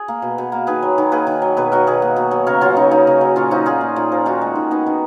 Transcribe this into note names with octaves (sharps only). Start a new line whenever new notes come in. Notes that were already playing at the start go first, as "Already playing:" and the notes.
Already playing: G#4
A#3
B2
B2
A#3
D#3 G#4 B4
F#3
D#3
A#3 G#4 B4
D#3
F#3
B2 G#4 B4
F#3 F#4 A#4
B2 G#4 B4
A#3
B2
F#3
C#3 A#4 C#5
F#3 C#4 F4
C#3 D#4
A#3 D#4
C#3
F#3
A#2 C#4 F4
F3 D#4 F#4
A#2 F4 G#4
A#3
A#2
F3
D#3 D#4 F#4
G#3
D#3
B3 D#4
D#3